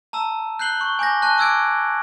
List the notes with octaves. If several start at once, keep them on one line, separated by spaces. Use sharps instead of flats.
A5 A#5 E6
F#6 G6 C7 F#7 G7
C#6
G#5 D6 G6 A#6
A5 C#6 F#6
D6 E6 G#6 D7